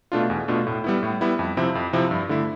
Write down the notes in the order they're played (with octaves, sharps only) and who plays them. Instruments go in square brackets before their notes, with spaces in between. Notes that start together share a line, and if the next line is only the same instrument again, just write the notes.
[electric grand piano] B2 A3 D4 F4
E2
B2 A3 D4 F4
A2
G3 B3 E4
A2
G3 B3 E4
F2
C3 F3 C4 E4
F2
C3 F3 C4 E4
G2
D3 A3 E4